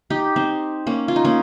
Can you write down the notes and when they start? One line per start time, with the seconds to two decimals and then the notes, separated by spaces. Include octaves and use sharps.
0.10 D#4 G4
0.36 C4 D#4
0.87 A#3 C#4
1.08 F4
1.16 D#4
1.25 A#3 C#4